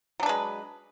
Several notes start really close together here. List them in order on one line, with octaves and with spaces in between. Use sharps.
F#3 D4 B4 G#3